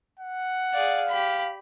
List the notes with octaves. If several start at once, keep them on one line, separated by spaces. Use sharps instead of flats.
F#5
G#4 D5 F5
G4 B5